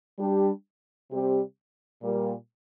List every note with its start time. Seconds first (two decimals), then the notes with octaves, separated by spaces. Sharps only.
0.17 G3 D4 G4
1.09 C3 G3 C4 G4
2.00 A#2 G3 A#3